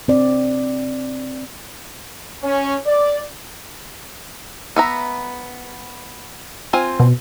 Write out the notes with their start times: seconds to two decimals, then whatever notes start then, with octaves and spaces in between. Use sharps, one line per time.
0.08 C4 D5
2.43 C#4
2.86 D5
4.76 B3 E5 A#5
6.73 C4 F4 G#5
7.00 B2